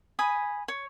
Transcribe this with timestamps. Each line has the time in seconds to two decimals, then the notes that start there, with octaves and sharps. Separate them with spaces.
0.19 G#5 B5 D#6
0.68 C#5